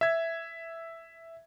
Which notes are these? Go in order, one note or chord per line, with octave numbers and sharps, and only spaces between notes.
E5 G#6